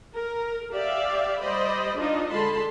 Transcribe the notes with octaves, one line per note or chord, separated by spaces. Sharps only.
A#4
G4 D5 E5 F5
G3 C5 D5 D#5 B5
D4 D#4 F4 D#5
D3 G#3 A5 B5 C6